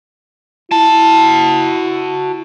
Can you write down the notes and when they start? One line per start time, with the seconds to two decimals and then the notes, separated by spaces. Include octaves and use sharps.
0.72 E4 F#4 A5